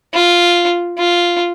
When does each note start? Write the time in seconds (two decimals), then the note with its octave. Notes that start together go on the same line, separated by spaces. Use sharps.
0.14 F4
0.98 F4